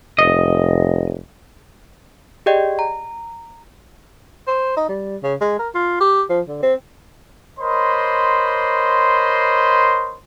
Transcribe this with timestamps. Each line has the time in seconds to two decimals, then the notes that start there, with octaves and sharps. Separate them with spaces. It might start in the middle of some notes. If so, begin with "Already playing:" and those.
0.19 F1 D#5
2.46 G4 G#4 D5 D#5 G5
2.79 A#5
4.47 C5
4.77 D#4
4.89 G3
5.23 C#3
5.41 G#3
5.59 A#4
5.75 F4
6.00 G4
6.29 F3
6.48 D3
6.62 C4
7.59 A#4 C5 C#5 D#5 B5 C6